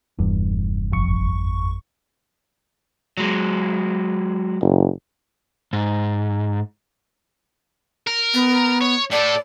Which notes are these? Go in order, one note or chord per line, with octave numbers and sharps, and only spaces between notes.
F1 E2 G2
G#1 F2 C#6
F#3 G#3
F#1
G#2
A#4
B3
C#5
A2 A4 D5